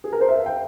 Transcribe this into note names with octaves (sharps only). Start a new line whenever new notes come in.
G#4
A#4
C5
E5
F5
G5